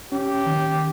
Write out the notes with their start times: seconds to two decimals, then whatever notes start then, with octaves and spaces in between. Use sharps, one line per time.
0.11 C#4 G4
0.46 D#3